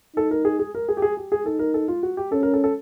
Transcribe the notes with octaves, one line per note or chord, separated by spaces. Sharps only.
D#4 A4
A#4
G#4
G#4
A#4
G#4
G4
G#4
G4
G#4
D#4 A4
A#4
A4
F4
F#4
G4
C#4 A4
A#4
A4
A4